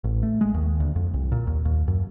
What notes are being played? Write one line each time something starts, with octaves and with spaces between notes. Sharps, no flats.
A1
A3
G#3
D#2
D2
F2
C2
A#2
D#2
D#2
F#2